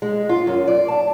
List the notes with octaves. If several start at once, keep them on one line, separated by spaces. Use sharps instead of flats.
G#3
F4
F#2
D5
A5